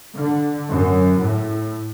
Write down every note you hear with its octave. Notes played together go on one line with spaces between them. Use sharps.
D3
F#2
A2